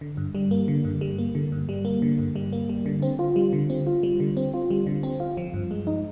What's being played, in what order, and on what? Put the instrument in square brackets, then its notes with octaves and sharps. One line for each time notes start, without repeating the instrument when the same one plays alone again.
[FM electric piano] D3
G2
G3
A#3
D3
G2
G3
A#3
D3
G2
G3
A#3
D3
G2
G3
A#3
G3
D3
C4
F4
G3
D3
C4
F4
G3
D3
C4
F4
G3
D3
C4
F4
F3
G2
G#3
D#4